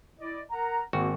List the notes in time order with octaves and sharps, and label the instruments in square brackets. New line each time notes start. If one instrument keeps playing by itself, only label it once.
[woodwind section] E4 D5 D#5
A#4 F#5 A#5
[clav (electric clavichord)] G#1 F#4 [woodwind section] G#3 A#3 C4